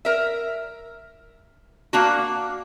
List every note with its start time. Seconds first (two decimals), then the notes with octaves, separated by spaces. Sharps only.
0.05 A#4 E5
1.93 A#3 D4 F#4